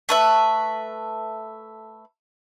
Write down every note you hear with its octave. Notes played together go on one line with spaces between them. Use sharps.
A3 B4 E5